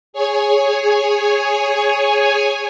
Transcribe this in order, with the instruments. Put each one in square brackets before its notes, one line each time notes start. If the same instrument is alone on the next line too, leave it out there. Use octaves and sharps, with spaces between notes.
[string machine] G#4 C#5 G#5